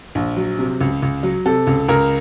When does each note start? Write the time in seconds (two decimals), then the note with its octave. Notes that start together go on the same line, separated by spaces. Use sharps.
0.15 A#1
0.37 F#3
0.59 C3
0.81 C#2
1.02 C#2
1.23 F#3
1.46 C3 A4
1.67 C#2
1.89 C#2 A#4